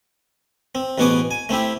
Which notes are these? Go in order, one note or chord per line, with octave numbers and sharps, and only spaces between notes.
C4
A1 B2 B3 F#4 G#4 D6
G#5
A3 C4 E4 G4